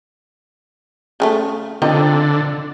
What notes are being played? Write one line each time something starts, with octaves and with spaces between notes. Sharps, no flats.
C#3 G#3 A3
D3 F3 C4 D#4